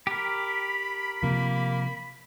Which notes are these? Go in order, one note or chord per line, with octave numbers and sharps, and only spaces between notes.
G4 A#4 B5
C3 F3 A#3